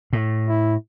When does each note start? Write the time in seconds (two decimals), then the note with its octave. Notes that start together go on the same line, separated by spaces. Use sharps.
0.13 A2
0.48 E4